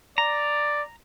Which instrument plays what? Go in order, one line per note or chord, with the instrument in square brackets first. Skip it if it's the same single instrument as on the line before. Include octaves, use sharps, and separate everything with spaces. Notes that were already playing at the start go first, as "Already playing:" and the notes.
[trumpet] D5 [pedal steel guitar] A#5